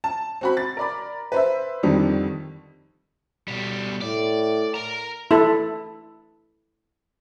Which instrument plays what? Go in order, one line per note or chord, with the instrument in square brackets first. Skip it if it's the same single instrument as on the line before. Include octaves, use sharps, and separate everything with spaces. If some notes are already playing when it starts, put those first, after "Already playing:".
[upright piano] A5
C4 F#4 B5
A6
A#4 D5 B5
B4 C5 E5
F2 D3 D#3 G3
[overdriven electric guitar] B2 G3
[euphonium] A2 [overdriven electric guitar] D5
[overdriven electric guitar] A#4 A#5
[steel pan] E4 A4